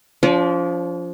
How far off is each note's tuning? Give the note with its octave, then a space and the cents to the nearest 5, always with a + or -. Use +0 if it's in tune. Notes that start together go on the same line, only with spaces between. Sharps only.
F3 +0 D4 -45 D5 -40